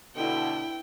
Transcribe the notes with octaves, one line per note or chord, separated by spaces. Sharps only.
B2 D3 E4 G5